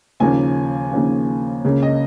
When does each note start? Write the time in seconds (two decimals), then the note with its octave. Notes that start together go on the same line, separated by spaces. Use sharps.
0.20 D#2 C#3 F3 A#3 C#4 G#5
0.92 D#2 C#3 F3 A#3 C#4
1.65 C#2 C#3 A#3 C#4
1.83 D#5